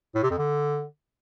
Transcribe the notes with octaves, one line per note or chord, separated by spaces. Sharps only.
A2
C3
F2
D3